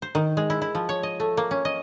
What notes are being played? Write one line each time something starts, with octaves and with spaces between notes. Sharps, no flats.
C5
D#3
G#3
E4
E4
F3
C#5
D#5
A3
A#3
C#4
D#5